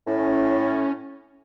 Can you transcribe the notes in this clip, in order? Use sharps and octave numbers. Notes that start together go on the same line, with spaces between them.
A2 C#4